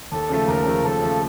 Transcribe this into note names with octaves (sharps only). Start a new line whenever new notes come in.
D#2 A4
C#3 F3 A3
D#2 A#4
C#3 F3 A3
D#2 A4
C#3 F3 A3